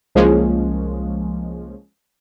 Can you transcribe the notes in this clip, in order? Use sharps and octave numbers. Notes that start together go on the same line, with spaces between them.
C2 F3 G#3 A#3 C#4